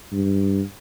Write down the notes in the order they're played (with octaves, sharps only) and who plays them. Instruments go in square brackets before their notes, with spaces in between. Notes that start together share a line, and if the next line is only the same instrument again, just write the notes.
[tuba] G2